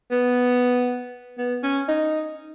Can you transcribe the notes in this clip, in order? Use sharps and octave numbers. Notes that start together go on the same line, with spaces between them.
B3
B3
C#4
D#4